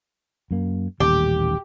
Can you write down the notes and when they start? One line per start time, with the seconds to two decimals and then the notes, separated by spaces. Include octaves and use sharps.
0.51 F#2 A#3
1.00 D#1 A1 D#2 G4